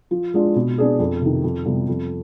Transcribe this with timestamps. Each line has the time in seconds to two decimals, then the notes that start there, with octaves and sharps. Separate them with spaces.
0.11 F3
0.34 G#3 D4 F4
0.56 B2
0.78 B3 D4 G#4
0.99 F2
1.21 C3 D#3
1.44 F2
1.65 C3 G3 B3 F4
1.88 F2